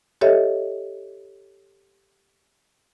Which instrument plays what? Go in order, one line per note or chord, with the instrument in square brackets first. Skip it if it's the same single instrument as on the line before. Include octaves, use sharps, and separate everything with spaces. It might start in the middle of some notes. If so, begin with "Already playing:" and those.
[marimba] G4 A4 C#5 D#5 E5